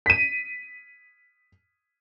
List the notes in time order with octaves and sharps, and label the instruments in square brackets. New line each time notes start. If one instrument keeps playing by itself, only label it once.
[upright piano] B6 D#7